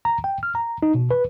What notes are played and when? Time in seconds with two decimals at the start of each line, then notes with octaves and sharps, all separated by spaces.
0.05 A#5
0.24 G5
0.43 F6
0.55 A#5
0.83 D#4
0.95 B2
1.11 B4